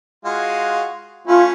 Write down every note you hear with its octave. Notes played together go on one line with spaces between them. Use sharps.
G#3 F4 F#4
A3 C#4 E4 F4